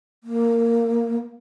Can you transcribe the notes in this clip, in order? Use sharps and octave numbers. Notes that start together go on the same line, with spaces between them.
A#3